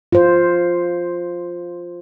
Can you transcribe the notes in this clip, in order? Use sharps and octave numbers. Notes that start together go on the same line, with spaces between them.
F4 C5